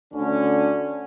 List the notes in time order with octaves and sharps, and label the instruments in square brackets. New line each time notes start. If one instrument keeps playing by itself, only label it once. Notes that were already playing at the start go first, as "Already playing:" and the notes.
[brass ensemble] D2 D3 C#4